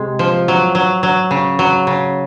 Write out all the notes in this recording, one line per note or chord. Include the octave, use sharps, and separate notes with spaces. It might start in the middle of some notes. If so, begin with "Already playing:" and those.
Already playing: C3 G#3
F3
F#3
F#3
F#3
C#3
F#3
C#3